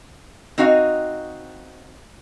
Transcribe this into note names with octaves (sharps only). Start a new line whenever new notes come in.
C4 D#4 F#4 D#5 F5